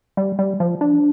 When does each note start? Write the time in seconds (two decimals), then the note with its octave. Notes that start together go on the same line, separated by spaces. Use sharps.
0.17 G3
0.39 G3
0.60 F3
0.81 D4